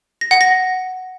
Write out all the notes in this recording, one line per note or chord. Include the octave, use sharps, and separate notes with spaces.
A#6
F#5
A#6